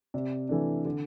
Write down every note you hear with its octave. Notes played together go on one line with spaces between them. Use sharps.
C3 D5
E3 A3 D4
D3